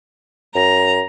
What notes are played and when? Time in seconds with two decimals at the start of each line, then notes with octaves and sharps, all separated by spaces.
0.55 F#2 A#5